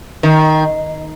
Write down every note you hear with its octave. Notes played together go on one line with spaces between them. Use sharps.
D#3